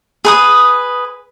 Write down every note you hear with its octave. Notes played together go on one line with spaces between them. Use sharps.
G#4 B4 D#6